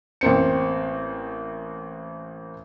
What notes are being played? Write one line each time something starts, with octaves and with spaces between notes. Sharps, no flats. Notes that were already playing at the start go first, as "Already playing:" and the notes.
A1 A#3 C4 C#7